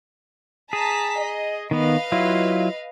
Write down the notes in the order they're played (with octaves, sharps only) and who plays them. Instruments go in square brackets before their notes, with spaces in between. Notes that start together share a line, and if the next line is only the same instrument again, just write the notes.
[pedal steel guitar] G#4 [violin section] A5 A#5 B6
[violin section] D#5
[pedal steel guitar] D#3 B3 [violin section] B4 D#5 F5
[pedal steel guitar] F#3 E4 F4